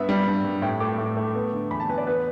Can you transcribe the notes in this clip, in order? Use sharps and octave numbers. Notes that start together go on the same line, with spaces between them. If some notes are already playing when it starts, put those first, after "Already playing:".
Already playing: G2 B3 E5
G3
G2
G2
A2 G5
A3 D6
A2
A3
B3
D3
E2 B5
A5
E2 B4
D5
B3 B4